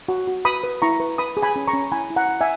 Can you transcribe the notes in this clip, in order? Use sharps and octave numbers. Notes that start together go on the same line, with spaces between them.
F#4
F#4
B4 B5 D#6
B4
E4 A#5 C#6
B4
B4 B5 D#6
G#4
G#5 B5
C#4
A#5 C#6
C#4
E4 G#5 B5
E4
F#5 A#5
E4
E5 G#5